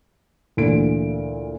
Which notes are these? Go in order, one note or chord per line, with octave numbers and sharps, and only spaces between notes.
D2 A#2 E3 D7